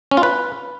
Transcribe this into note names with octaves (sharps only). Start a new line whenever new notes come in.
C#4
F4
B4